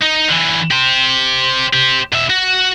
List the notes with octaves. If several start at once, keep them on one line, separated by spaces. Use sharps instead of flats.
D#4
D3 E3
G4 C5
G4 C5
B2 E5
F#4